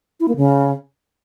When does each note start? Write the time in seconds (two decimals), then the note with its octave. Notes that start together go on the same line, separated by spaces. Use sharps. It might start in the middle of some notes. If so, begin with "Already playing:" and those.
0.20 E4
0.28 A#3
0.37 C#3